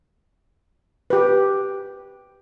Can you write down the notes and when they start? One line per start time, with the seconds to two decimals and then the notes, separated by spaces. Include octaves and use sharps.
1.10 G4 B4